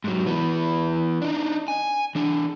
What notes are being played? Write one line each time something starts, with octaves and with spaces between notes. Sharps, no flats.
G#2 F#3
E3 B3
D4 D#4
G#5
E3 D4